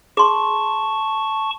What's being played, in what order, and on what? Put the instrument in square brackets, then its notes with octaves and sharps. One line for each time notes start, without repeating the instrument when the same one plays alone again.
[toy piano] G#4 C6 [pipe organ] A5 C#6